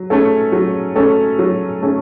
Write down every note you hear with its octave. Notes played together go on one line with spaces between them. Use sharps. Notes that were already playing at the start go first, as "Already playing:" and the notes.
Already playing: F#3
A3 C#4 A4
F#3
A3 C#4 A4
F#3
A3 C#4 A4